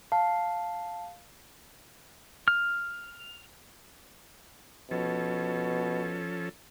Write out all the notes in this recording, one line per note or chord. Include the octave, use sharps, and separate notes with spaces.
F5 A5
F6
B2 F3 C#4 A4